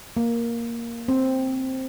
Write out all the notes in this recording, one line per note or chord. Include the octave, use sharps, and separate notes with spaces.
A#3
C4